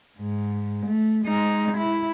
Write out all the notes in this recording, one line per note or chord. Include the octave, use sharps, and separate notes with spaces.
G#2
A3
G#3 D#4
E4